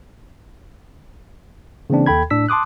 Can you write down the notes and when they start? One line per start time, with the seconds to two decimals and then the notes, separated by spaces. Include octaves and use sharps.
1.90 C#3 E3 A#3 C4 D4
2.06 D#2 A4 G5 B5 G#6
2.30 A2 D4 E6 B6
2.49 A5 C6 D6 D#6 F#6